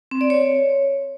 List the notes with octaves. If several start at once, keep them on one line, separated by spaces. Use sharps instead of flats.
C4
D5
C#5